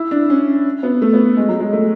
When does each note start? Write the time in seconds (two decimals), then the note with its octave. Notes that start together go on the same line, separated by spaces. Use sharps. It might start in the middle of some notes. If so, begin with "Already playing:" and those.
Already playing: E4
0.11 D4
0.30 C#4
0.83 B3
1.02 A3
1.13 B3
1.37 G#3
1.48 F#3
1.60 G#3
1.73 A3